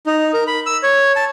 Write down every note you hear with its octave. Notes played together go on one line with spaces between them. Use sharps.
D#4
A#4
B5
E6
C#5
A5